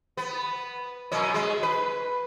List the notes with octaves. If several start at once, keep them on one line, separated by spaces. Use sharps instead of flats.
B3
F#2 B2 C#4
G#3
B4